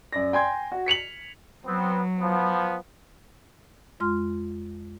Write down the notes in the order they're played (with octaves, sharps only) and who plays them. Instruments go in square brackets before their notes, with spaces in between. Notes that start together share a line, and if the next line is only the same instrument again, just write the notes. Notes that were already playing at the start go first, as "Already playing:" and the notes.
[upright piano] F#2 D5 A#6
G5 G#5 C6 G#6
F#4
B6 C#7 F7 F#7
[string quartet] F#3 [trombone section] B3 C4
[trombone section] F3 B3
[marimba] F2 G#3 F4 C6 F6